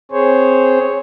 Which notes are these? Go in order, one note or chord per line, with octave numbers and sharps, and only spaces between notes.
C4 G#4 C5 C#5